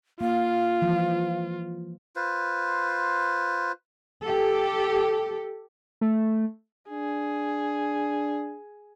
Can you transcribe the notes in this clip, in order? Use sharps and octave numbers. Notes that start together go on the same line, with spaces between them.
A#3 F4 F5
E3 F3 G#3
F4 B4 C5
G4 A4
A3
D4 G#4